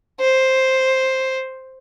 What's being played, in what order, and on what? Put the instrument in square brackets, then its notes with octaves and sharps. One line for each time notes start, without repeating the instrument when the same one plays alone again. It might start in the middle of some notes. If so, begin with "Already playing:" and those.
[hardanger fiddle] C5